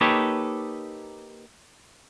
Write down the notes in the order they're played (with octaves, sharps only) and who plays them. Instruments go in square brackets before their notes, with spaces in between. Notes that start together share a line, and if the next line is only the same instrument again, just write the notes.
[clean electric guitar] A#3 D#4 G4 A4 B4 C#5